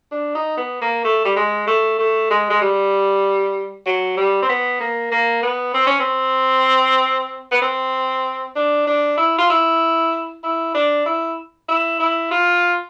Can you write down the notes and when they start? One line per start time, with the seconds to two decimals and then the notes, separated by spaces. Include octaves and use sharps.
0.11 D4
0.35 D#4
0.57 B3
0.81 A#3
1.04 A3
1.25 G3
1.36 G#3
1.67 A3
1.99 A3
2.30 G#3
2.50 G#3
2.61 G3
3.86 F#3
4.17 G3
4.42 C4
4.49 B3
4.80 A#3
5.11 A#3
5.42 B3
5.74 C4
5.86 C#4
6.00 C4
7.51 B3
7.62 C4
8.56 D4
8.87 D4
9.17 E4
9.38 F4
9.50 E4
10.44 E4
10.74 D4
11.06 E4
11.68 E4
12.00 E4
12.31 F4